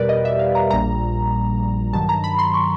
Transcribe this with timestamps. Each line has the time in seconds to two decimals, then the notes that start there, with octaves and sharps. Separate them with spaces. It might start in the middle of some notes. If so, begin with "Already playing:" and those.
Already playing: E2 B2 G3 G4 A#4 B4 D5
0.09 D#5
0.25 E5
0.39 F5
0.55 A#5
0.71 A#1 A#2 G3 A#5
1.93 G2 D#3 F#3 A5
2.09 A#5
2.24 B5
2.39 C6
2.54 C#6